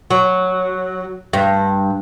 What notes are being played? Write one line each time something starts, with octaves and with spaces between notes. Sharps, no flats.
F#3
G2